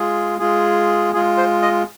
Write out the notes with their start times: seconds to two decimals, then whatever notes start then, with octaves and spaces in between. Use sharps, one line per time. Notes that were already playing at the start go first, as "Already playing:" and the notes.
Already playing: G#3 F4 G#4
0.39 G#3 F4 G#4
1.13 G#3 F4 G#4
1.37 C5
1.62 D#5